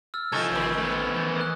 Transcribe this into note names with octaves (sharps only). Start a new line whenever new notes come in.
E6 F6 A6
C2 F3 D#4 A4 G#5 C#6 G#6
A1 D#3 C4
A3 B3
E3 G6
D#6 F#6